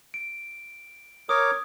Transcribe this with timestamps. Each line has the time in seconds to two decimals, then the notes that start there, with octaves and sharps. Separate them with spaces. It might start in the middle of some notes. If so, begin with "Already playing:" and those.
0.14 D7
1.29 A#4 C#5 D6 D#6